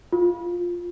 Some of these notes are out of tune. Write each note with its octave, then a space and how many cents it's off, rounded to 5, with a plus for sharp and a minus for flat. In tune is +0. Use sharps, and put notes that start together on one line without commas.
F4 +5